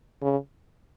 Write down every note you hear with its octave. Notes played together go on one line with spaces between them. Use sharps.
C#3